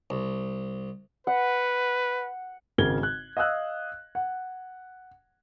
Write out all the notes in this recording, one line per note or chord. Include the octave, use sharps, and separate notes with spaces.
C2
B4 F#5
G#1 C#3 A#4 G#6 G7
F#6
D#5 F5 D#6 E6 F#6
F#5